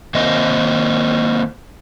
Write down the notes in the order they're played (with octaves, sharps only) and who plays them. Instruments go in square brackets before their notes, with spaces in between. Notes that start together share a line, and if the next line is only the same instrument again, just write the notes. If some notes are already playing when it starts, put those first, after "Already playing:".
[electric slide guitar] D#3 A#3 C4 D#5